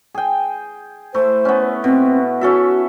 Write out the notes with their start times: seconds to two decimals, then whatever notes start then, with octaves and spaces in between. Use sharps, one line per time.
0.15 G#4 G5
1.14 A3 E4 C5
1.45 B3 C#4
1.84 B2 C4
2.41 C#4 F#4 A4 E5